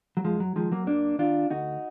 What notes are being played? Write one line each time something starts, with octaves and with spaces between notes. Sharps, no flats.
F#3
F#2 F3 G#3
F#3
D#3 F3 G#3
F#3 A#3
F#2 A#3 D4
D#3 D4 F4
D2 D#4 F#4